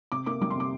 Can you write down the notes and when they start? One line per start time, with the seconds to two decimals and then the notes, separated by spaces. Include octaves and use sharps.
0.12 C3 D6
0.26 A#3 D6
0.41 G3 D6
0.50 C6
0.55 C3 D6